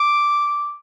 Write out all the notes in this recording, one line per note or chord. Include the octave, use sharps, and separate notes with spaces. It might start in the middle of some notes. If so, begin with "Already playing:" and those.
Already playing: D6